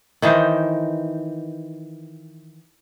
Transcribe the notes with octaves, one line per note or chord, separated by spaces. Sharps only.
D#3 E3 D#4 C5